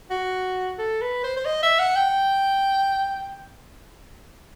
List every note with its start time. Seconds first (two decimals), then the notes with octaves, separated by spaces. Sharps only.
0.10 F#4
0.78 A4
1.01 B4
1.24 C5
1.37 C5
1.45 D#5
1.63 E5
1.79 F#5
1.96 G5